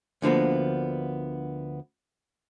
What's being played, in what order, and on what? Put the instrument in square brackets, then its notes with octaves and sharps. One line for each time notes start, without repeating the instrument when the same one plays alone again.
[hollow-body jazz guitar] D2 D3 F3 A#3 B3